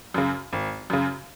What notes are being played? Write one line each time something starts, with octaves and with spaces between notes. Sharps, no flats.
F#2 C#3
G#1
F#2 C#3